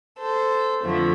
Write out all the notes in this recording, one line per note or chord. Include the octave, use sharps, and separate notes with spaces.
A4 C5
F2 D3 F3 A3